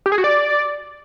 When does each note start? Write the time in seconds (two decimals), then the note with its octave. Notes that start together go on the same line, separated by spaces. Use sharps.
0.06 G4
0.12 G#4
0.18 F#4
0.24 D5